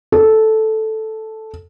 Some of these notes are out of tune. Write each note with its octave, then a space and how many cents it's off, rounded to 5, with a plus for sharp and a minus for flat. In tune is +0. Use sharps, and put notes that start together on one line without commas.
A4 -5